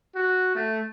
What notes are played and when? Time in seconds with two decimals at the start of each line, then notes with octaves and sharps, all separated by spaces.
0.15 F#4
0.55 A3